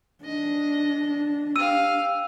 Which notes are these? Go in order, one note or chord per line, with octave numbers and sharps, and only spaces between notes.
D4 D#5
G4 F5 E6 D#7